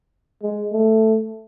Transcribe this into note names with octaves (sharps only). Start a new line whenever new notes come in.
G#3
A3